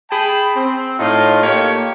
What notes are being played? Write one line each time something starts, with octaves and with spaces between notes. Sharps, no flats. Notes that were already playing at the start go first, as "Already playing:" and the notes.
G#4 G5 A5 B5
C4
A2 D#4 F4
A#3 G4 A4 C#5